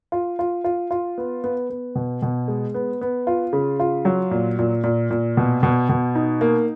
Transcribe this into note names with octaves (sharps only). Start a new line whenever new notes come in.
F4
F4
F4
F4
B3
B3
B3
B2
B2
G#3
B3
B3
F4
C#3
F4
F#3
A#2
A#2
A#2
A#2
B2
B2
B2
D#4
A#3